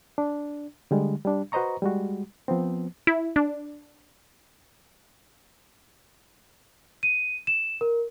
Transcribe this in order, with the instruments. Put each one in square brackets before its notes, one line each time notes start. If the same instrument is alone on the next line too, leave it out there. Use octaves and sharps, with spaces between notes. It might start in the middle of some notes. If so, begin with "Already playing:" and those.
[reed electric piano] D4
D3 G3 G#3
G3 D4
F#4 B4 C5 D#5 A#5 C#6
G3 G#3 F#4
F3 B3 C4
[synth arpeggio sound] E4
D4
[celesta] D#7
E7
A#4